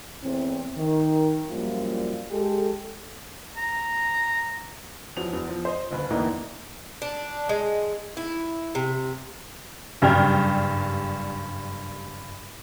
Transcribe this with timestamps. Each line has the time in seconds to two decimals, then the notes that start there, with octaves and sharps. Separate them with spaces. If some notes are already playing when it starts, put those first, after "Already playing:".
0.22 E2 A2 C4
0.77 D#3
1.49 F#2 F3 G3 A#3 F4
2.32 G#3 G4 A4
3.57 A#5
5.17 E2 F3 F#3 F7
5.33 E2
5.49 F3
5.65 C5 D#5
5.91 F#1 D2 B4
6.11 E2 A2 D3 E3 A#3 D#4
7.02 D4
7.49 G#3
8.17 E4
8.75 C3
10.02 F#1 G2 G3 G5 F6 G#6